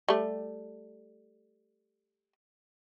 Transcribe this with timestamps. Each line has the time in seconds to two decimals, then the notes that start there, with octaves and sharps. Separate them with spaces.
0.09 G3 A3